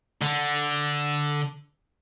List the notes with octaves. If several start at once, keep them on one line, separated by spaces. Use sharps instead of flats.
D3